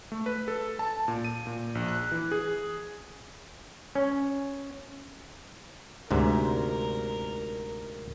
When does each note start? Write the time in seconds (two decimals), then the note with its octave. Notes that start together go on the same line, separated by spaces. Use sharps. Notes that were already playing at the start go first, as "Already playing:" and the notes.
0.12 A3
0.26 B4
0.48 A4
0.79 A5
1.08 A#2
1.25 D#7
1.47 A#2
1.75 A#1
1.88 F#6
2.12 E3
2.32 G#4
3.95 C#4
6.11 D2 G#2 C3 A#4